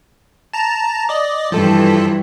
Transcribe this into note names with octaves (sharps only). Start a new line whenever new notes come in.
A5 A#5
D5 D#5
G2 E3 F3 A4